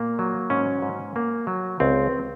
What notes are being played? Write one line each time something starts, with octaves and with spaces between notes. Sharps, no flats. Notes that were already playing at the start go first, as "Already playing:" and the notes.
Already playing: A#2 A#3
F#3
G#2 C#4
G#2
A#3
F#3
C#2 C4